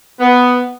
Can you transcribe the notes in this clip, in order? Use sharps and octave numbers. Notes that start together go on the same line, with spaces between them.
B3